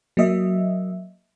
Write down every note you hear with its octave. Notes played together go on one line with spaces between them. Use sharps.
F#3 A#3 D#5 E5